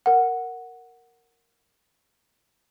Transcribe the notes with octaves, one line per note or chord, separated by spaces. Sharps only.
A#4 F#5